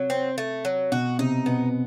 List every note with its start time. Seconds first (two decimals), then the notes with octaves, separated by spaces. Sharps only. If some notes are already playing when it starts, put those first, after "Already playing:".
Already playing: C3 F#3
0.10 C4
0.38 A3
0.65 F#3
0.92 B2 F#4
1.19 C3 D#4
1.46 B2 B3